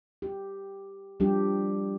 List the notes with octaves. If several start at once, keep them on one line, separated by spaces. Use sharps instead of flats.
G4
F3 G3 D4 G4